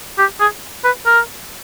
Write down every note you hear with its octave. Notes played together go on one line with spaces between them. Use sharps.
G4
G#4
B4
A#4